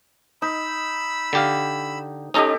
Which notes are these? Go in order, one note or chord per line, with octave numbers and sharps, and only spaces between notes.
D#4 B5 E6
D3 G4 F5
C#4 D#4 G4 A4 D#5 A#5